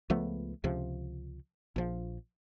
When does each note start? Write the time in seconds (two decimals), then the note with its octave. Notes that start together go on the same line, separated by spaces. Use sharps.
0.10 C#2 F3 A3 B3
0.64 C#2 C3 F3
1.76 A#1 F3